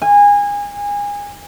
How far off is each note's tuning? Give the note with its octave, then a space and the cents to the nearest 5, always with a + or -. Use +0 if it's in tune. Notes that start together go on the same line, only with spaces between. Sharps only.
G#5 -25